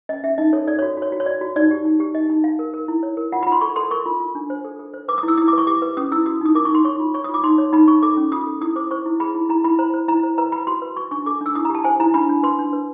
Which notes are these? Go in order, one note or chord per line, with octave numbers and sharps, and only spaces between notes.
C#4 D#5
C#4 E5
D#4 D#5
A4 C#5
A4 D5
F#4 C#5
F#4 C#5
F#4
C#5
F#4 D5
F#4
D#4 D5
G4
D#4
G4
D#4 D#5
D#4
D#4 F5
A#4
A#4
E4
C#5
A#4
F4 F#5
B5
F4
C6
A4 C#6
A4 C6
A#4 C#6
F4
F4
D4
C5
A4
A4
C5
B4 D6
D#6
E4
E6
E4 D#6
D6
B4 C#6
G4 D6
B4
C#4 D#6
E4 E6
F#4 D#6
D#4 D#6
A#4 D6
C#6
D#4 C6
C#5 C#6
F4
C#5 C#6
D#6
F4
D6
D#4 C6
C#5
D#4 B5
D#4 C#6
A4 D6
C#4
F4 D#6
A4
E4 D#6
C5 D6
C5 C#6
E4
G#4 B5
E4
E4 A#5
E4 B5
C5 A#5
C5
E4 A#5
C5
B4 A#5
B4 B5
F#4 C6
B4
F#4 C#6
D4 C#6
A4 D6
D4 E6
E4 D#6
A#5
G4 A5
C5 G#5
E4 A#5
D4 B5
D4
B4 C6
D4
B4